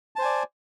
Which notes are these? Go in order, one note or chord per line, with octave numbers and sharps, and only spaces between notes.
C5 D5 G#5 A5